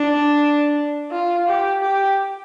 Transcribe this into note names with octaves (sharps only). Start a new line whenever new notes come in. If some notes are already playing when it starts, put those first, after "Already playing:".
Already playing: D4
F4
G4
G4